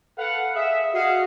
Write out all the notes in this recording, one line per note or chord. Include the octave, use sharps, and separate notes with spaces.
A4 B4 F5 F#5
G#4 D#5 E5
F#4 G#4 D#5 F5 F#5